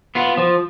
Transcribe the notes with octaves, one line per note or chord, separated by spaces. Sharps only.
B3 F4
F3